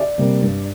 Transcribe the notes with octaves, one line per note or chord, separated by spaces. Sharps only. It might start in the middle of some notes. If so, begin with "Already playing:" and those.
Already playing: D5
C3 G3 A#3
G2